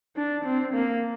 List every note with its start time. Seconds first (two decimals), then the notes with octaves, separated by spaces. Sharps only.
0.16 D4
0.45 C4
0.74 A#3